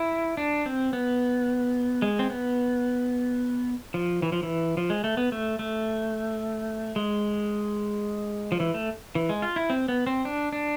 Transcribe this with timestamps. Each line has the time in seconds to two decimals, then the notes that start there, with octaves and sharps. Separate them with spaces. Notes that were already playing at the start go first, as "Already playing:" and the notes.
Already playing: E4
0.37 D4
0.66 C4
0.93 B3
2.02 G#3
2.19 C4
2.30 B3
3.94 F3
4.22 E3
4.32 F3
4.43 E3
4.77 F3
4.90 G#3
5.04 A3
5.17 B3
5.32 A3
5.59 A3
6.96 G#3
8.52 F3
8.60 E3
8.74 A3
9.15 E3
9.29 G#3
9.42 F4
9.56 E4
9.70 C4
9.88 B3
10.07 C4
10.25 D4
10.53 D4